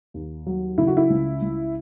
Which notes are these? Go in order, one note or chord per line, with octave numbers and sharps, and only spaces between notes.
D#2
F#3
C#3 E4
F#4
E4
C#2
C#2